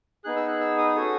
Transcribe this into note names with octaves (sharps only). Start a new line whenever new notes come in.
B3 D#4 G#4 F#6
E6
F#6
E6
D#6
C#4 F#4 A4